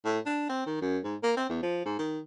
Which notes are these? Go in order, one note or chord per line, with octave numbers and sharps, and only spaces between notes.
A2
D4
C4
D#3
F#2
G#2
A#3
C4
E2
F3
G#2
D#3